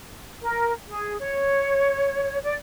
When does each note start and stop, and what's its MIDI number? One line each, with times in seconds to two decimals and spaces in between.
0.42 0.72 70
0.88 1.14 68
1.20 2.38 73
2.43 2.54 74